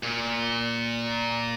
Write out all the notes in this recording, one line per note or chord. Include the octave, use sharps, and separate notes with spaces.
A#2